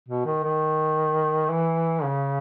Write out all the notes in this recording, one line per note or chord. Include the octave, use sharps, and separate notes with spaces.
B2
D#3
D#3
E3
C#3